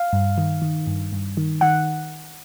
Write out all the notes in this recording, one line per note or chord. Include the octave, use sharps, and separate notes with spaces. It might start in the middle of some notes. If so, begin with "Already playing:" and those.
Already playing: F5
G2
D#3
D#3
G2
G2
D#3
D#3 F#5